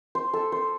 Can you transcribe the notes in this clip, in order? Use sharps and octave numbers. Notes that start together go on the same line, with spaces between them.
C5
A4
C5